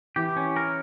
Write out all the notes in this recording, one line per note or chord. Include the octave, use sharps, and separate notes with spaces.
E3 G4
C#4
A#4